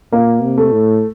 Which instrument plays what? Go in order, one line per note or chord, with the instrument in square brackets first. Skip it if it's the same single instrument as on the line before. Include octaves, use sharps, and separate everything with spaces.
[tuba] A#2 [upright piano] A#3
[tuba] C3
[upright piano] A3
[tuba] A2